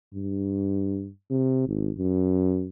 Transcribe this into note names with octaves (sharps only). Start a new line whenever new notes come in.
G2
C3
G#1
F#2